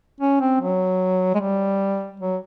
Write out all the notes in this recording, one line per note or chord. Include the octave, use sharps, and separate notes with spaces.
C#4
C4
F#3
G#3
G3
F#3